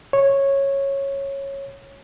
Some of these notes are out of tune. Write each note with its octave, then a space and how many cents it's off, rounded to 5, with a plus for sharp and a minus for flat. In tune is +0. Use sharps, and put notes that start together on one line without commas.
C#5 -10